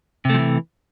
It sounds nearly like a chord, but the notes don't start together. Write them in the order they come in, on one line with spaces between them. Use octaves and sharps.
C3 A3 F3 E3